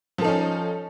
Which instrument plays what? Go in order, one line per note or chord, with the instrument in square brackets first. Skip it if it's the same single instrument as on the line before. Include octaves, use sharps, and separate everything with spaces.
[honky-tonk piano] F3
A4
D#4
C#4